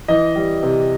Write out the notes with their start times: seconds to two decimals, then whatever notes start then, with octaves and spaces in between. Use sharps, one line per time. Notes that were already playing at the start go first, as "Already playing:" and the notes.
0.08 E3 D#5
0.36 G3
0.63 C3